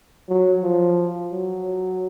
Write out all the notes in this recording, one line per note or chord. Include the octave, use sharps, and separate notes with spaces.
F#3
F3
F#3